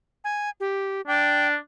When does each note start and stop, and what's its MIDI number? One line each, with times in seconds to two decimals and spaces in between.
0.24 0.49 80
0.60 1.01 67
1.08 1.55 62
1.08 1.48 79